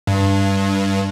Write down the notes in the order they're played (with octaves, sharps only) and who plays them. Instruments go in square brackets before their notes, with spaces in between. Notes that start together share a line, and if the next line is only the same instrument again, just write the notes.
[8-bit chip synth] G2